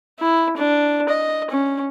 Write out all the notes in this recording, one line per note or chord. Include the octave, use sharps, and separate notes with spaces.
E4
D4
D#5
C#4